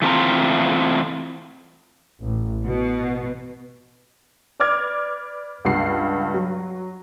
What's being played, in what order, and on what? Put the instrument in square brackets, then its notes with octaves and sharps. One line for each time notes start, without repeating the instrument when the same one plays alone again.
[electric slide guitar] E3 A3 C4 F4 A#5
[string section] A1
B2
[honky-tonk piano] B4 D5 D6 F6 G#6
C#2 G2 F#5 C7
F#3